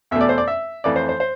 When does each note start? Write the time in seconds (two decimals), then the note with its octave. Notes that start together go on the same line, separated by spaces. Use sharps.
0.11 E2 B2 A3 E5
0.21 D5
0.29 C5
0.38 D5
0.47 E5
0.84 F2 E3 A3 D5
0.96 C5
1.09 C5
1.20 C5